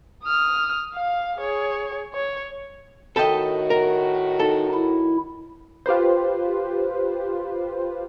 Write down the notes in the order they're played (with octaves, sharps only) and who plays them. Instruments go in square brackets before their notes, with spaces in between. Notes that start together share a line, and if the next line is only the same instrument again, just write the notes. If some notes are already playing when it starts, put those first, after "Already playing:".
[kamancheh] D#6 F6
F5
G#4 C#5
C#5
[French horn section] A2 D#3 F#4 [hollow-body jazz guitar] A4 A5 [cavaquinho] D#5 G5 B5
[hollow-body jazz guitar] A#4
[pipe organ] D#4 [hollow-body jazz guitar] A4
[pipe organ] E4
[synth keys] F4 G4 B4 C5